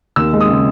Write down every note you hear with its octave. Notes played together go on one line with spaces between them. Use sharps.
D#2 E6
G#3
D#6
C#3